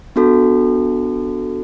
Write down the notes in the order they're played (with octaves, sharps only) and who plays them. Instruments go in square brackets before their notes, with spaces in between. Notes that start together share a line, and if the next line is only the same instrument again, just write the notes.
[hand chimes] B3 D4 F#4 A4